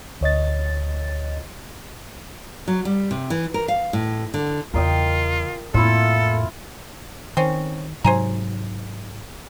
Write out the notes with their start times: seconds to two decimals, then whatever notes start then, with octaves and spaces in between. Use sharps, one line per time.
0.21 D2 C#5 D#5 A6
2.68 F#3
2.85 G3
3.11 C3
3.30 E3
3.54 A#4
3.68 F5
3.93 A2
4.34 D3
4.74 E2 C#3 F4 A#4 D#5 G5
5.74 F2 A2 A#3 E4 F4 A4
7.37 D#3 C4 C#4
8.04 G#2 C3 F#3 C5 G#5 A#5